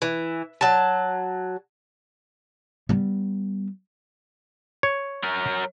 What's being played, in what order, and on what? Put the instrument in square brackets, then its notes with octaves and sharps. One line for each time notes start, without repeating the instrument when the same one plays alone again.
[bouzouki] E3
F#3 A5
[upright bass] G3 B3
[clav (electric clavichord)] C#5
[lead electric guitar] F#3 A#4